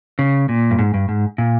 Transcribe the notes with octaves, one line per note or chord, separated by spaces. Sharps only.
C#3
A#2
G2
G#2
G2
G#2
A#2